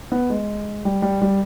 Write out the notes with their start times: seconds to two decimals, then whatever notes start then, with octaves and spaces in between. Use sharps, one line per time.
0.12 B3
0.30 G#3
0.85 G3
1.02 G3
1.22 G3